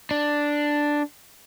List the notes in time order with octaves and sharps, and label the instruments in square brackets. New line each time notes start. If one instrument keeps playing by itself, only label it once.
[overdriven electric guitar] D4